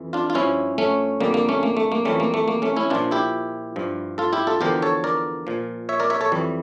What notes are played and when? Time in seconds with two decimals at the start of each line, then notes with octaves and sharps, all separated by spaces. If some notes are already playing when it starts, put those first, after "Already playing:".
Already playing: F2 E3
0.13 D4 F4
0.30 F4
0.35 G2 F3 C#4 E4
0.78 A3 C#4
1.20 F2 D3 G3 A#3
1.34 A#3
1.49 A3 C#4
1.63 A#3
1.77 A3
1.92 A#3
2.05 F2 E3 G3 A3 C#4
2.20 A#3
2.34 A3
2.48 A#3
2.62 A3 C#4
2.76 C#4 E4
2.90 A#2 F3 D4 F4
3.11 E4 G4
3.76 G2 F3
4.18 F4 A4
4.33 E4 G4
4.47 F4 A4
4.61 E2 D3 F3 G4 A#4
4.82 A4 C#5
5.04 A#4 D5
5.47 A#2 F3
5.89 C#5 E5
6.00 A#4 D5
6.10 C#5 E5
6.21 A4 C#5
6.32 F2 E3 G3